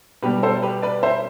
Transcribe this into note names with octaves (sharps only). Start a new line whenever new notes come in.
B2 G3 G4 B4
A4 C5
G4 B4
B4 D5
C5 E5